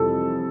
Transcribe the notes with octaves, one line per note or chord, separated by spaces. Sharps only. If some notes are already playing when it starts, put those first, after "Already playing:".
Already playing: F2 C3 E3 G3 A4